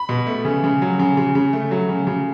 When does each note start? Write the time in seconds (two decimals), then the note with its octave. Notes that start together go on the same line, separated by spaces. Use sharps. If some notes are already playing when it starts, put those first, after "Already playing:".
Already playing: B5
0.09 B2
0.27 A3
0.45 C#3
0.64 C#3
0.82 F#3
0.99 C#3
1.17 C#3
1.35 C#3
1.53 A3
1.71 F#3
1.89 C#3
2.07 C#3